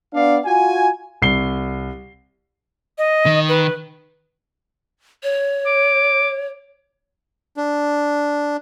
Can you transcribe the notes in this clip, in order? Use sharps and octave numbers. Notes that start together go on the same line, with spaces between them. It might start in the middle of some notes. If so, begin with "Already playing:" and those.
B3 D4 D5 F5
F4 F#4 G#5
C2 C7 G7
D#5
D#3
B4
C#5
D6
D4